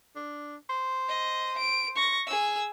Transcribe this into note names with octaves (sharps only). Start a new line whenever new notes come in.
D4
C5
D#5
D7
C#6 A#6
G#4 E6